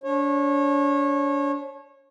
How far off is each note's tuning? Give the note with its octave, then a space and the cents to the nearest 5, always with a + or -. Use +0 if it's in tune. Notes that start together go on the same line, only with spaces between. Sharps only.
D4 -35 C#5 -25